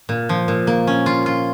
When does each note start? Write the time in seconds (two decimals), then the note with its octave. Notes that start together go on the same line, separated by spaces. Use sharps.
0.09 A#2
0.29 F3
0.48 A#2
0.67 A#3
0.87 C#4
1.06 F4
1.26 F4